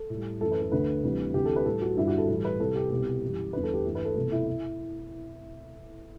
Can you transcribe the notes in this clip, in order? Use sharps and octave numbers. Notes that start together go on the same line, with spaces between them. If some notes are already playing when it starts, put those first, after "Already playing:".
Already playing: A4
A2 G3
F#2 E3 A3 A4
B4
A4
D2 D3 A3 B4
D2 C3 E3 G3
D2 C3 E3 G4
A4
B4
A2 G3 A4
F#4
G2 D3 G3 E4
F#4
A4
A2 E3 G3 A4
B4
C2 C3 G3 A4
G4
C2 B2 G3 G4
F#2 E3 G3
E2 D3 G3 B4
A4
G4
G2 E3 A3
B4
A4
C2 B2 A3 A4
E4
E4